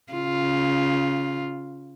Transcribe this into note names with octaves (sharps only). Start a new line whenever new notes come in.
C#3 F4